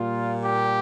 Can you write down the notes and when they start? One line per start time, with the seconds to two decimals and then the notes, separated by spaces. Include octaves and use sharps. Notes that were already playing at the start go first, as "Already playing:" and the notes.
Already playing: A#2 G3 A#3 F4
0.43 G4